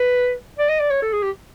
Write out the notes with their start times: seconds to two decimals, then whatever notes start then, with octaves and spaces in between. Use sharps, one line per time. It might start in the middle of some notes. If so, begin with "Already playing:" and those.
Already playing: B4
0.58 D5
0.69 D#5
0.79 D5
0.90 C#5
1.02 A4
1.13 G#4
1.23 G4